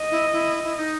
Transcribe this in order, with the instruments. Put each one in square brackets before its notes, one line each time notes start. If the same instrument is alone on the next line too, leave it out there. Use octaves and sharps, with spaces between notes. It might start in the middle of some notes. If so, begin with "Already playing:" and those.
Already playing: [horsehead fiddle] D#5
[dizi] E4
E4
E4
E4
D#4